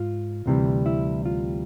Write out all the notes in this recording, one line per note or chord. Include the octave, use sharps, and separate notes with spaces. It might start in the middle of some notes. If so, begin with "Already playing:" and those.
Already playing: G#2 F4
D2 C3 E3 G3
E4
F4